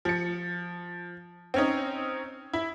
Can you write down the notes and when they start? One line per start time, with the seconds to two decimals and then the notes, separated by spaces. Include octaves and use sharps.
0.05 F3 C#7
1.54 C4 C#4 D#4
2.53 E4